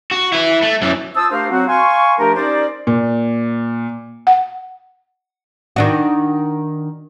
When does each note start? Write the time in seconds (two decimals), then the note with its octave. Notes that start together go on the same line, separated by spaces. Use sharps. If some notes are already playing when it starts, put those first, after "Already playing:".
0.11 F#4
0.32 E4 B4
0.62 A3
0.82 F#2 E3
1.16 F4 C5 A5 D#6 E6
1.31 A3 D4 G4 A#4 C5 F5
1.51 F#3 C4 F#4
1.68 F5 G#5 C6 C#6
2.19 F3 A3 D4 G4 A#4
2.36 C#4 D#4 G4 A#4 C5 D5
2.87 A#2
4.27 F#5
5.76 D#3 D4 F#4